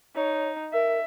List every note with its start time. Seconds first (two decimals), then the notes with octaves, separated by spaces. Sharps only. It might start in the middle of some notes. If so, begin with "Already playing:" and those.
0.15 D#4 C#5
0.73 A#4 E5